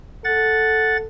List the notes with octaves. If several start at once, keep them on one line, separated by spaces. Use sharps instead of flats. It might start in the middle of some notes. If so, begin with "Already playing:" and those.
A4 F#5 A6